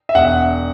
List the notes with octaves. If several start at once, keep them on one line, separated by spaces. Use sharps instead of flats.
E5
E1 F#5